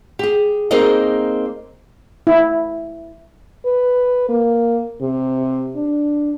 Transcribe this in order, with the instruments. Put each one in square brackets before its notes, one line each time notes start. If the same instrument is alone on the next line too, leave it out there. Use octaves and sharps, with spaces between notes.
[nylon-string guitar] G4 G#4
A#3 C4 D#4 G#4 D#5
[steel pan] E4
[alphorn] B4
A#3
C3
D4